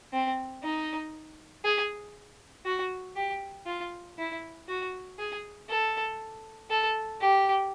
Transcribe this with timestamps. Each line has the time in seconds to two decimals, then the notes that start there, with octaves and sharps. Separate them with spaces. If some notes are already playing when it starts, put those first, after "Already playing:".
0.13 C4
0.64 D#4
1.64 G#4
2.66 F#4
3.16 G4
3.67 F4
4.18 E4
4.68 F#4
5.19 G#4
5.69 A4
6.70 A4
7.21 G4